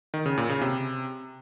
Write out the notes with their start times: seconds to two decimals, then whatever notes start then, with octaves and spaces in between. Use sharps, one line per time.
0.14 D#3
0.26 C#3
0.38 A#2
0.49 C#3
0.61 C3